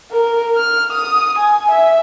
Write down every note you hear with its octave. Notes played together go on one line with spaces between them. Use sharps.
A#4
F6
D#6
G#5
E5